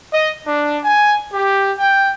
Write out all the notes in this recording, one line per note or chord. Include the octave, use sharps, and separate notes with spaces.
D#5
D4
G#5
G4
G5